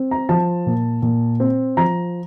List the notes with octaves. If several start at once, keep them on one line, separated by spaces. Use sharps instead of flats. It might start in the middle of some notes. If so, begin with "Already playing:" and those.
Already playing: C4
A#5
F3 A5
A#2
A#2
C4
F3 A#5